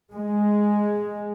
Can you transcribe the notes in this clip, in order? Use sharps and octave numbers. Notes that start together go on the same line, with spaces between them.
G#3